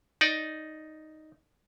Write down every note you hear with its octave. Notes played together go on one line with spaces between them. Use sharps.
D#4 D5